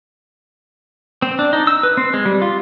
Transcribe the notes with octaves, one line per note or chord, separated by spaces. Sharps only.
C4
D4
D#4
E6
B4
C4
G#3
G3
F4